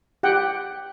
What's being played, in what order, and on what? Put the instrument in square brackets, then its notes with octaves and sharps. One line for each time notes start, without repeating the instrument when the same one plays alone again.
[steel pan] G4 F#5 G5